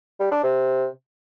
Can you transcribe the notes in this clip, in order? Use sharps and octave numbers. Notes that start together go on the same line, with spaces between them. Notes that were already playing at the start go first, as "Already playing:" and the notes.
G3
D4
C3